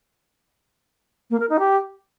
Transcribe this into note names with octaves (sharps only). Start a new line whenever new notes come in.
A#3
A#4
D#4
G4